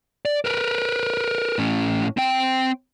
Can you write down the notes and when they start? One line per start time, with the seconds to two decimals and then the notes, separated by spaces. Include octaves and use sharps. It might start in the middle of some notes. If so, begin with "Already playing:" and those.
0.25 D5
0.45 A#4 B4
1.58 A2 C#4
2.17 C4 G5